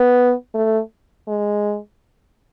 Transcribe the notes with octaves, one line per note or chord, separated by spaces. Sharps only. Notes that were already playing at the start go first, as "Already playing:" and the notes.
Already playing: B3
A3
G#3